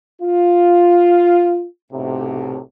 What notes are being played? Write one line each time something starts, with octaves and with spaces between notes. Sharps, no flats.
F4
B1 A2 C3